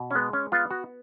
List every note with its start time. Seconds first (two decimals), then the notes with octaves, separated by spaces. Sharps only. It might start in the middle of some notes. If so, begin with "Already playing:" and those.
Already playing: B2
0.11 C#4
0.15 G#3 B3
0.33 C#4
0.52 B3 F4
0.71 F#4